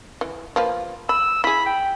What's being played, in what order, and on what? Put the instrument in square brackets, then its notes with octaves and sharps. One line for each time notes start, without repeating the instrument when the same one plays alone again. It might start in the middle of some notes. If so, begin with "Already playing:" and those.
[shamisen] E3
F3 A#3 B4
[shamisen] B5 [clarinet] E6
[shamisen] E4 G#4 [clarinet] B5
[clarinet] G5